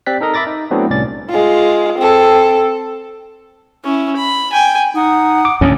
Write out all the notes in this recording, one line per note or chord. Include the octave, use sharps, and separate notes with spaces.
C4 G4 D5 F#6 B6
D#4 A4 A#4 D#5 A#5
E5 B5 D6 A6 A#6
D#4
F#3 A3 B3 C4 D4 E4
C2 A2 C#4 D5 A6
G#3 F4
C4 A4
C#4 E4
B5
G5 G#5
D#4 F#5 D#6
D6
D2 A2 C#4